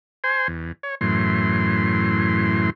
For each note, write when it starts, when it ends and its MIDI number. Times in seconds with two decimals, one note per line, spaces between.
0.24 0.48 72
0.24 0.48 80
0.24 0.48 84
0.48 0.72 40
0.83 0.95 73
1.01 2.70 42
1.01 2.70 45
1.01 2.70 52
1.01 2.70 84